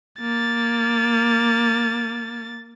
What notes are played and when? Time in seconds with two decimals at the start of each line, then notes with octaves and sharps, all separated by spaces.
0.21 A#3 A6